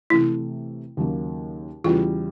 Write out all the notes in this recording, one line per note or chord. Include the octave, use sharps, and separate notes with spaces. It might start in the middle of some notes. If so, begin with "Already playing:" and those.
C3 E3 A3 E4
D#2 C#3 F#3 A#3
E2 C#3 E3 G3 F4